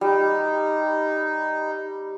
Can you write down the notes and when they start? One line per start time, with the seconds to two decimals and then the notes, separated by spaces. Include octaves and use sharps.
0.01 G3 D#4